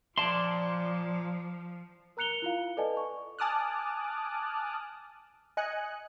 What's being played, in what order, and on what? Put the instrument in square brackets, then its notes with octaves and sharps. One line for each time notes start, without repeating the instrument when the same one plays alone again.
[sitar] A#2 D5 [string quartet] F3 [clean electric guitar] A5 C6
[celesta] A#4 A#5 F#6 C#7 F7 G7
E4 F4 F5
A4 B4 D5 D#5 G#5 A5
C#6
[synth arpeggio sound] G#5 A5 D6 D#6 F6 F#6
D#5 G#5 F#6 C#7